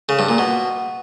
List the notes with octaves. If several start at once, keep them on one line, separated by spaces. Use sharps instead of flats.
C#3
G2
A#2
B2